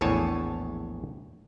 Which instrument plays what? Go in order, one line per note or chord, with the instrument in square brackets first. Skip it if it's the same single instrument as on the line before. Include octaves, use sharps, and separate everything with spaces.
[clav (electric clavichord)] A#1 E2 A2 C#5 G#5 A5